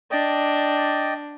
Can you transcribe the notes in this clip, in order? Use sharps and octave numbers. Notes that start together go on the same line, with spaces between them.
D4 D5 D#5 G5